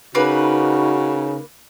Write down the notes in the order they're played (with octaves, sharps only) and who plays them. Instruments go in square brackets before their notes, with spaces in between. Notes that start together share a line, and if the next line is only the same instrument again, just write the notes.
[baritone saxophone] C#3 [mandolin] A#3 B4 [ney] D#4 [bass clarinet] F#4